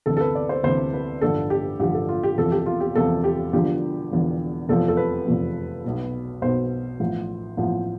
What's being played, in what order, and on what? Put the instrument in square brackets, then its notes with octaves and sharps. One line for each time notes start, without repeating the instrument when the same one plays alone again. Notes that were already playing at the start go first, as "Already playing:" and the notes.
[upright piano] D2 C3 E3 A4
A4
B4
D5
C5
D2 C3 E3 C5
B4
A1 G2 D3 F3 A4
G4
A1 G2 D3 F3 G4
A4
F4
G4
E1 E2 C3 F3 A4
G4
F4
G4
E1 E2 C3 F3 A4
G4
E1 E2 D3 F3 G4
E1 E2 D3 F3
F1 E2 C3 F3 A4
A4
B4
F1 E2 C3 F3
B1 B2
B1 B2 C5
A1 A2 F3
A1 A2 F3